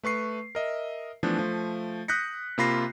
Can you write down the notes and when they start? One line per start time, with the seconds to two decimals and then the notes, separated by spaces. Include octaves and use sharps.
0.03 A3 B4 C#6 C7
0.55 A#4 D#5 E5
1.23 E3 F3 A3 B3 D4
1.38 F3 A3
2.08 D#6 F#6 G6 A#6 B6 C#7
2.58 C3 A#3 F4 B5 A#6 C7